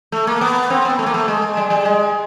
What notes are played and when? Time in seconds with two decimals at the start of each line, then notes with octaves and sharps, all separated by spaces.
0.12 A3
0.27 A#3
0.41 B3
0.70 C4
0.85 B3
0.99 A3
1.06 A#3
1.14 A3
1.28 G#3
1.57 G3
1.70 G3
1.85 G#3